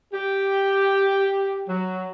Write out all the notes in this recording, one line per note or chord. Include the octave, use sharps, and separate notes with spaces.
G4
F#3